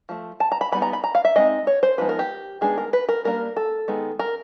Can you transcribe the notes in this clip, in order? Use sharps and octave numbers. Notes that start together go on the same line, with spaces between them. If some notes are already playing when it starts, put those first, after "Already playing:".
F3 A3
A5
A#5
B5
D#3 G3 B3 D#4 B5
A#5
B5
A#5
F5
E5
G#3 C4 D#4 D#5
C#5
C5
F3 G#3 B3 D#4 B4
A#4
G4
D#3 G#3 B3 D4 G#4
A#4
B4
A#4
G3 A#3 D4 A#4
A4
D#3 G#3 B3
A#4